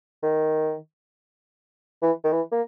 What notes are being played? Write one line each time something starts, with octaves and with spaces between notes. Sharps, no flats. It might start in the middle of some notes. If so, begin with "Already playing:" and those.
D#3
E3
D#3
E3
A#3